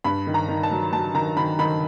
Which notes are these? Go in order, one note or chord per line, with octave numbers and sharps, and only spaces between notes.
G2 B5
D#3
A#5
D#3
A5
F#3
F#3 A5
D#3 A#5
D#3 B5
D#3 B5